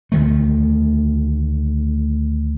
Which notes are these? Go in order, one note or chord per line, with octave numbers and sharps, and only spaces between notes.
D2 D#3 A3